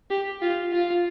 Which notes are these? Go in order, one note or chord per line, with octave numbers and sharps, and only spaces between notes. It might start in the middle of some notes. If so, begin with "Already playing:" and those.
G4
F4
F4